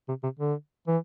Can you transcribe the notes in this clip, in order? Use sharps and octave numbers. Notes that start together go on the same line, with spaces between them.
C3
C3
D3
E3